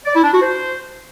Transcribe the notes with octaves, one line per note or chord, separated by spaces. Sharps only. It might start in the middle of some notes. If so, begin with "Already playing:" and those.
D5
E4
D4
F#4
C5